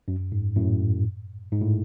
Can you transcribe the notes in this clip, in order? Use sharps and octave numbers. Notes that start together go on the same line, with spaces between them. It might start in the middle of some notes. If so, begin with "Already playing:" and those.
F#2
G#2
F#2 A2
G#2
A2